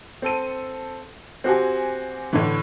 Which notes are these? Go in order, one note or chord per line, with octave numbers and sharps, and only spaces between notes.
C4 A4 D#7
C4 F#4 G4 G#5
A2 D3 E3